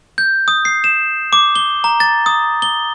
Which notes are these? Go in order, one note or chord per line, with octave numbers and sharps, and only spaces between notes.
G6
D#6
C7
E7
D6
G7
A#5
A6
D#6
G7